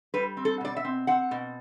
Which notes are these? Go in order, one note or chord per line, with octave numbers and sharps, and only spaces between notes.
G3 B4
C4
A4
B2 D5
E5
C4
C4 F#5
B2